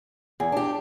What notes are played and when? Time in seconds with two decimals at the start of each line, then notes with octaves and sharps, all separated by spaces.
0.40 E2 G#4
0.52 D4 G4